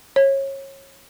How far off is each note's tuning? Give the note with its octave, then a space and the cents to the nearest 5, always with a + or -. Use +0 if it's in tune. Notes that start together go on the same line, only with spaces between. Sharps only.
C#5 -25